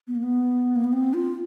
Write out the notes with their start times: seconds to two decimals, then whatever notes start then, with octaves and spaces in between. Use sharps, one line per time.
0.07 B3
0.15 A#3
0.23 B3
0.76 A#3
0.84 B3
0.93 C4
1.14 F4